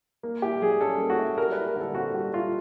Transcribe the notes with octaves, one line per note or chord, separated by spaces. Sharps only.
A#3
E4 G4
F#3 G#4
C#4 A4
A#3
F#4
E4
G3 A#4
B4
E4
A#4
D3
A4
C4 F#4
G3 F#4
E4 F4